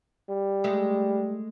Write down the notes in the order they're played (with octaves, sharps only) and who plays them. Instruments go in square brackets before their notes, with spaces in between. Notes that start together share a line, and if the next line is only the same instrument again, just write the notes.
[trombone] G3
[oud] G#3 A3